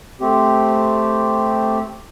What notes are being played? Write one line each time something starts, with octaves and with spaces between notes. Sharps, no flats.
A3 C4 G4